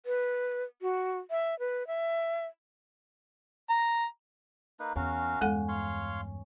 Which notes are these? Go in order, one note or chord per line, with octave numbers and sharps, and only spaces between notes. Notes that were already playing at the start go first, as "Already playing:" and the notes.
B4
F#4
E5
B4
E5
A#5
A#3 D#4 B4
E2 C#4 F#4 A#4 F5
E2 G2 G#3 A4 F#5
C#5 F5 C6